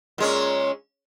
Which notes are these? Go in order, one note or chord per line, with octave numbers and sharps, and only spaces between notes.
A#2 G#3 C#4